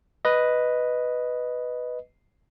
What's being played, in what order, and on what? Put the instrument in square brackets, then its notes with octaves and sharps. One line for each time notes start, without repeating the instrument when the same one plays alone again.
[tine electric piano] B4 D#5